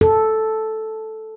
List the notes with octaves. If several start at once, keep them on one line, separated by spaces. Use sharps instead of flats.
A4